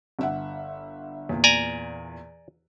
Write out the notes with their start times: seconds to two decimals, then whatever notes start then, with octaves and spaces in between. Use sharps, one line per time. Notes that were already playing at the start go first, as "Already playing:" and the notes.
0.19 G1 E5 F#5
1.29 E2 A#2
1.44 D5 G#5 A#5